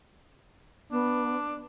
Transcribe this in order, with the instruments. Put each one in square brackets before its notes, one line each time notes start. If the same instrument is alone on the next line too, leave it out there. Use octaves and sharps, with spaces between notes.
[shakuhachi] B3 [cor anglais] D4